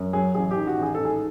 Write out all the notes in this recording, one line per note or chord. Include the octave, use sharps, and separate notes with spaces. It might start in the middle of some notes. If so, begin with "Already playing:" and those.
Already playing: F#2
F#3 G#4
A1 G#4
G4
D#3
F#4
A1
G#4
G#2 A4
G#4